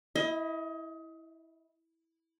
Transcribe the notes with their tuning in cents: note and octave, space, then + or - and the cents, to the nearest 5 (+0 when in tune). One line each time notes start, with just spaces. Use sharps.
E4 -10 D#5 +25